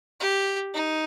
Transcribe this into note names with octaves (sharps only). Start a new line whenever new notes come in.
G4
D#4